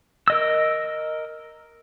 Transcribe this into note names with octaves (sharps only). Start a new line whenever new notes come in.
A#4 D#5 E6